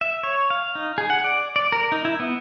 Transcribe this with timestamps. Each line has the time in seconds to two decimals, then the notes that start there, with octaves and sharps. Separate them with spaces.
0.01 E5
0.23 C#5
0.50 F5
0.75 D#4
0.98 G#4
1.10 F#5
1.24 D5
1.56 D5
1.72 A#4
1.92 D#4
2.05 E4
2.20 B3